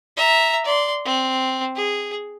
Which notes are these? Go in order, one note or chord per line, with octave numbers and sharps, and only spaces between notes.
E5 A#5
D5 C6
C4
G#4